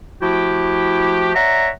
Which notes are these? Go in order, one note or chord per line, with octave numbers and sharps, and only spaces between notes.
F3 A3 E4 F#4 G4
C#5 D5 E5 F#5 A#5